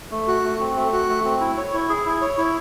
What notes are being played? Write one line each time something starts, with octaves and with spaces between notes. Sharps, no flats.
A3
F#4
A3
C4
A3
F#4
A3
C4
E4
C#5
E4
G#4
E4
C#5
E4